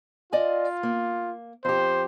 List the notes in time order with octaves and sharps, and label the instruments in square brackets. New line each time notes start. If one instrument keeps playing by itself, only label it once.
[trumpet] F4 [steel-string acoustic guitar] D5 D#5 G#5
[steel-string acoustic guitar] A#3
[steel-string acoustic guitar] F2 G4 [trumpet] C5